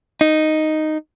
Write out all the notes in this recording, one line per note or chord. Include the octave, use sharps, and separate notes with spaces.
D#4